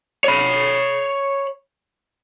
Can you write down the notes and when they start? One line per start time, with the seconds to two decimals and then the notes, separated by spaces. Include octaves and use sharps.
0.24 C#5 B5